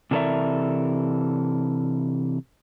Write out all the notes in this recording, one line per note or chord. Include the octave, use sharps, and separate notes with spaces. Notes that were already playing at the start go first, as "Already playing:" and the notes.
C3 E3 A4 A#4 D5 E5